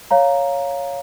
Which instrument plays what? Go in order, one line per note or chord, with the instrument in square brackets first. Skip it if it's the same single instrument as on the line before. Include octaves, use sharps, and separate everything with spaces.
[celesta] C#5 F5 A#5